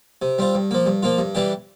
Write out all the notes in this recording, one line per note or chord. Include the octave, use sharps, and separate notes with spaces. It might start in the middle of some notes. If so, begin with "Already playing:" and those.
C3
G3 C4 F4
G2
F3 A#3
G2
F3 A#3 F4
G2
E3 G3 D4 G4